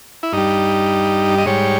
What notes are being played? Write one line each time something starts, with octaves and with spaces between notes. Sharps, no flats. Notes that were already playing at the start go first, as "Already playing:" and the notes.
E4
G2 G3 D#4
D#5
G#2 G3 C#5